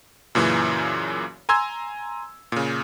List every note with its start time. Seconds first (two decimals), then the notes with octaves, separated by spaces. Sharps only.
0.35 F#2 A#2 C#3 E3
1.49 G#5 A#5 C6 E6 G#6
2.52 A#2 C#3